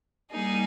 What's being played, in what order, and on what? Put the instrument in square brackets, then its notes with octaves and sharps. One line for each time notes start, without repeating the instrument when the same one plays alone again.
[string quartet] G3 A#3 D#4 G#4